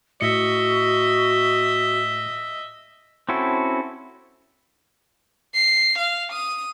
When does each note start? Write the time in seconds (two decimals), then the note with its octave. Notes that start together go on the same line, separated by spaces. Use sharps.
0.21 A2 F#4 D#5 E5 C#7
3.29 C4 C#4 E4 F#4 A4
5.54 C7
5.99 F5
6.32 D#6